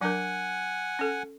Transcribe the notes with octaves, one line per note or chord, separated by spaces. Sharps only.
F#3 D4 A#4 F#5 G#5
C#4 A4